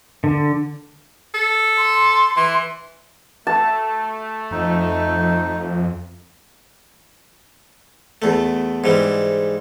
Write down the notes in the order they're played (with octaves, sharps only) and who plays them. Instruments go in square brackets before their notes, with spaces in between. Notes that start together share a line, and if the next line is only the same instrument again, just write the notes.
[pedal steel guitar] D3
[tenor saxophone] A4
[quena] C6
[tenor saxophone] E3
[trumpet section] A3 [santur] A5
[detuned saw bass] F2 [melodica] D#4
[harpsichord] E2 A3
G#2 E3 G3